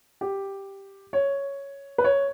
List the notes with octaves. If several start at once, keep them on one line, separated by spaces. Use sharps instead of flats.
G4
C#5
B4
C#5